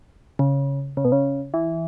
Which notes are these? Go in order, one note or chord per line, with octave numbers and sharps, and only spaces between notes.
C#3
C#3
B2
C#3
E3